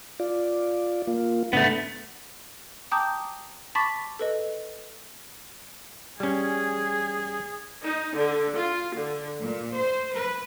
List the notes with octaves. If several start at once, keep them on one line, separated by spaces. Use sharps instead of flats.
F4 D5
A#3 F4
G#2 C#3 A3 B3 D4
G5 A5 A#5 D6 D#6 G6
A5 B5 C#6 D6 A6 B6
A4 B4 D#5
G3 C#4 G#4
D#4
D3
F4
D3
A#2
C5
B4